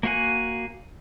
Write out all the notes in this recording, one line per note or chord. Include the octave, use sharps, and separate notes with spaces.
A#3 F#4 F5 F#5 G#5